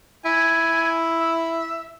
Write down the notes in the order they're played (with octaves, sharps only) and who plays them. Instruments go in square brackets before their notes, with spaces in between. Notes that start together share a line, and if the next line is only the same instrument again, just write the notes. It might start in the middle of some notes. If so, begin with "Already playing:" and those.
[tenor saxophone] E4 [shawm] G#5
[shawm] E5